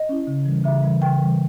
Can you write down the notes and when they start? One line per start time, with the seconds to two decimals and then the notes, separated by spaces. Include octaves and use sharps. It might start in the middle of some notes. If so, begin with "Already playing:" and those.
Already playing: D#5
0.09 C#4 E4
0.27 C#3
0.45 E3 G3
0.64 C#3 E5
0.83 E3 G3
1.02 C#3 G5
1.20 E3 G3